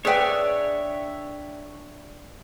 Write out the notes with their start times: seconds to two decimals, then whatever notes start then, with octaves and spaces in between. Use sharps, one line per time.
0.05 D4 G#4 B4 C#5 D5 E5 G5